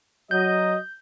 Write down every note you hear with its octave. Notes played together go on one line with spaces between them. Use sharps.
F#3 D#5 G6